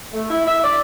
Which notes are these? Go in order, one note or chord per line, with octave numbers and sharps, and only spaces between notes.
A3
E4
E5
D5